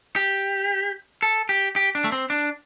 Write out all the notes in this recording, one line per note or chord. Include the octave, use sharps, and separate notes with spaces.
G4
A4
G4
G4
D4
A3
C4
D4